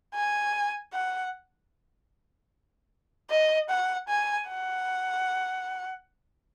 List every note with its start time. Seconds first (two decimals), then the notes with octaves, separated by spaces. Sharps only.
0.14 G#5
0.93 F#5
3.30 D#5
3.69 F#5
4.08 G#5
4.48 F#5